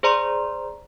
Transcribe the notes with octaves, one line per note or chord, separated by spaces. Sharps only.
G#4 C5 D5 A#5 C6